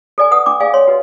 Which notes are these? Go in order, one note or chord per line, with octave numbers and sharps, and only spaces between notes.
A4 D5 G#5
A4 B4 F#5 D#6
D4 D6
G#4 D5 F5 G#5
C#5 C6
F#4 B4 D#5